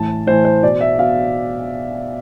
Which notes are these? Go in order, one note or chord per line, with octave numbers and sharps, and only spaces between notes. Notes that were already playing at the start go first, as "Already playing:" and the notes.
Already playing: A2 E3 A5
A2 E3 C5
C5
B2 D5
E5
B2 F5